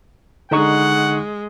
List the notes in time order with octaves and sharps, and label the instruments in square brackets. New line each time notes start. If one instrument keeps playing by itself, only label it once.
[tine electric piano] D3 D#4 C#6 [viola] G#3 [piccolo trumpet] F#5